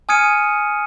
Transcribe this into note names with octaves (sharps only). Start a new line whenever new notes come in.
G#5 D#6 F6 G#6 C#7 D#7